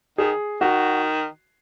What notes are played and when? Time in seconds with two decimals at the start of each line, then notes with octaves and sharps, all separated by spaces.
0.18 D#3 G#4
0.61 D#3 F#4